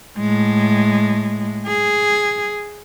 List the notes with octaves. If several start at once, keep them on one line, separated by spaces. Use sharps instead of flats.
A2 G#3
G#4